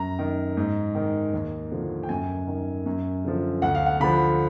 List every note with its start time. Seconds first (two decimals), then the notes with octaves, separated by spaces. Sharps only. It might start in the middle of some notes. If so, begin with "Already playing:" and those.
Already playing: F#2 A#5
0.19 D#3
0.57 G#2
0.95 D#3
1.34 D#2
1.71 D3 F3
2.03 G5
2.09 F#2 G#5
2.47 D#3
2.86 F#2
3.25 D3 F3
3.62 D2 F#5
3.75 F5
3.86 F#5
4.00 D3 F3 B5